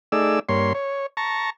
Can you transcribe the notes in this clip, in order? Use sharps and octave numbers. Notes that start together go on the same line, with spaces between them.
A3 D#4 G#4 D5 E6
G2 A#3 C#5 C6
C#5
A5 A#5 C#6